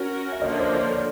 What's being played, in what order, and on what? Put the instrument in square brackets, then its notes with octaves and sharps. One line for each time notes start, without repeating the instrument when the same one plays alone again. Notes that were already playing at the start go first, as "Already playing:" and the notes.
Already playing: [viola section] C#4 F#4 A#4
[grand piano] E5
[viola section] D3 F3 A#3 [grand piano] C#5 D#5
[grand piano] C5 D5
C#5
D5